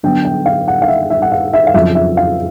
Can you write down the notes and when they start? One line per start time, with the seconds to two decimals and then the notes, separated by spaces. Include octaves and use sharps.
0.03 D3 F#3 B3 D4 G5
0.25 G5
0.46 F5
0.68 F#5
0.82 F5
0.88 E5
1.10 E5
1.22 F#5
1.32 F5
1.53 E5
1.67 F5
1.74 F2 C#3 F#3 E5
1.95 E5
2.17 F5